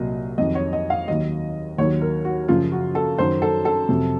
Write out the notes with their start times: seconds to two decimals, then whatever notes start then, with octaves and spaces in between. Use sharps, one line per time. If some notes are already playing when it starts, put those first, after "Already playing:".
Already playing: C2 A#2 F#3 D#5
0.38 F2 D#3 F#3 D#5
0.55 C#5
0.73 D#5
0.90 F5
1.08 D#2 D#3 F#3 D#5
1.78 D#2 D#3 F#3 C#5
2.02 A#4
2.25 F#4
2.48 F#2 C#3 F3 F4
2.72 F#4
2.95 A4
3.18 F#2 D#3 F#3 C5
3.42 A4
3.65 A4
3.89 F2 C3 F#3